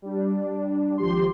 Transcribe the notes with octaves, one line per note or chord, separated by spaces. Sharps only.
G3 D4
G#1 F3 G4 C6